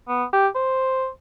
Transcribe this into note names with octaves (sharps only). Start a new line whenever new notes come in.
B3
G4
C5